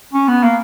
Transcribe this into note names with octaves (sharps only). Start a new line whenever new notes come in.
C#4
B3
A#3